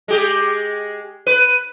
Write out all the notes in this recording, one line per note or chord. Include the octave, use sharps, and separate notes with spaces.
G#3 G4 G#4
B4 D#7